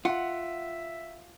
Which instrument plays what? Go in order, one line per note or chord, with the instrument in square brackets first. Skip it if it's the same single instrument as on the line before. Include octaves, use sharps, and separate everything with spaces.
[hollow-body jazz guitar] F4 [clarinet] E5 [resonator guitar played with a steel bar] F#5